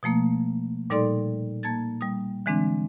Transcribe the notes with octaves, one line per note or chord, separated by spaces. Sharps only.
B2 F3 A3 A#3
A#2 G3 D#4 A4 D5 C6
A#3 A5 G#6 A6
G3 D#6
D3 E3 G#3 C4 D4